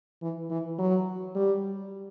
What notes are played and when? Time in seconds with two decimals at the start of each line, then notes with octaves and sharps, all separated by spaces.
0.22 E3
0.50 E3
0.79 F#3
1.35 G3